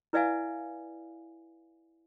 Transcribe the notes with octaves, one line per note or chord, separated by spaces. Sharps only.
E4 B4 D5 E5 F5 G#5